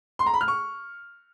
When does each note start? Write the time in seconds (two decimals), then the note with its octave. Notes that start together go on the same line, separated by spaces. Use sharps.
0.19 C6
0.26 A#5
0.34 B5
0.41 F6
0.48 C#6